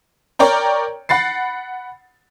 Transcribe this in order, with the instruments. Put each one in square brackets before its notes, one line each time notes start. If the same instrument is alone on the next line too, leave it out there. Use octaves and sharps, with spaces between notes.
[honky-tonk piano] A#4 C#5 D5 G5 A#5
F#5 B5 A6 C7